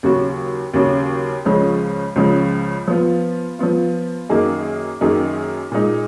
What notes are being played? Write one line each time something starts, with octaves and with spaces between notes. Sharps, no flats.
D#2 C#3 F#3 C#4 F#4
D#2 C#3 F#3 C#4 F#4
C#2 C#3 F3 G#3 C#4
C#2 C#3 F3 G#3 C#4
F3 B3 F4
F3 B3 F4
F#2 D#3 A#3 D#4 G#4
F#2 D#3 A#3 D#4 G#4
A#2 G#3 D#4